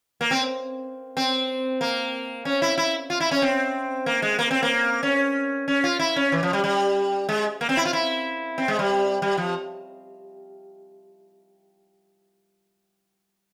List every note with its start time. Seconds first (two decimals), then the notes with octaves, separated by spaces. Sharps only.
0.21 A#3
0.31 C4
1.17 C4
1.81 A#3
2.45 C#4
2.62 E4
2.78 E4
3.10 F4
3.20 E4
3.31 C#4
3.42 C4
4.06 A#3
4.22 G#3
4.39 A#3
4.51 C4
4.63 A#3
5.03 C#4
5.68 C#4
5.84 F4
5.99 E4
6.16 C#4
6.32 E3
6.43 F3
6.53 G3
6.64 G3
7.29 G#3
7.61 A#3
7.69 C4
7.77 E4
7.85 F4
7.93 E4
8.58 C4
8.68 G#3
8.79 G3
9.22 G3
9.37 F3